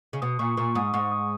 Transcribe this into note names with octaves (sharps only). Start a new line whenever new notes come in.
C#3
B2 D#6
A#2 C#6
A#2 C#6
G#2 D#6
G#2 C#6
D#6